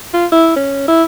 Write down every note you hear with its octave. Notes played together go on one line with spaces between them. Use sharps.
F4
E4
C#4
E4